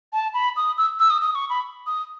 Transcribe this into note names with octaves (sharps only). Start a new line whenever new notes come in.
A5
B5
D#6
E6
E6
D#6
D#6
C#6
B5
D#6